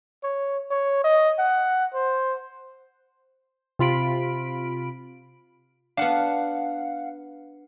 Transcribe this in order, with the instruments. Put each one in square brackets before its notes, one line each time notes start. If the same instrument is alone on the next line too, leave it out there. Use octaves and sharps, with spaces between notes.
[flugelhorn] C#5
C#5
D#5
F#5
C5
[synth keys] C3 F4 B5 D7
[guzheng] B3 D4 [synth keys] F5 F#5